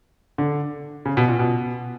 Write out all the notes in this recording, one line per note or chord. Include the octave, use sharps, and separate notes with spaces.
D3
C#3
B2
A#2
B2